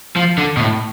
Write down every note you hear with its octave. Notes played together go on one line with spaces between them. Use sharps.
F3
D3
B2
A2